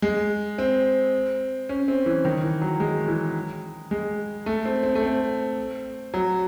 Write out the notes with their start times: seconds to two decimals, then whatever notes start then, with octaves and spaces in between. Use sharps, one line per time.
0.02 G#3
0.58 C4
1.69 C#4
1.88 C4
2.06 E3
2.25 D#3
2.43 E3
2.61 F#3
2.80 G#3
3.08 E3
3.91 G#3
4.46 A3
4.65 C4
4.83 C4
4.95 A3
5.03 C4
6.14 F#3